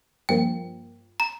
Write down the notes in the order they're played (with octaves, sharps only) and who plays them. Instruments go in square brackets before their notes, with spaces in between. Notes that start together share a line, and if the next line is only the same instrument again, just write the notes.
[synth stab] G2 F3 A#3 [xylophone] G5
[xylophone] A#5